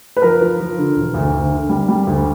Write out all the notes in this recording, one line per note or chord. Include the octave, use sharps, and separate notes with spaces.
B4
F3 A#4
F3
F3
D3
E1
D2
D2
D3
G3
G3
D2